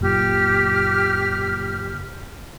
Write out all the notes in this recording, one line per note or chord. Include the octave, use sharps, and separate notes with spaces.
F#1 A#2 G4 F6